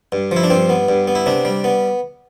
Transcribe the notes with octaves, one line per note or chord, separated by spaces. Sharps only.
G2
F3 E4
D4
G2 C4
B3
G2
B3
E4
C3 D4
G3
B3